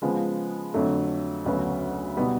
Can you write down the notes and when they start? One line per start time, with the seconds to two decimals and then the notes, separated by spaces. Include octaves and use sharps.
0.02 C#3 F3 G#3 B3
0.74 F2 D3 F#3 A3
1.45 D2 C#3 F#3 B3
2.17 B2 G3 B3 D#4 F#4